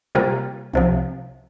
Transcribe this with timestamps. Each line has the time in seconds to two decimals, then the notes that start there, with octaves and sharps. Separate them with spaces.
0.15 C3 G3 A#3 F4
0.74 C2 C3 F3